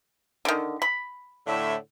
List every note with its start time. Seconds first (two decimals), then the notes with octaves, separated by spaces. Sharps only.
0.45 D3 D#3
0.82 B5
1.47 A2 D3 E5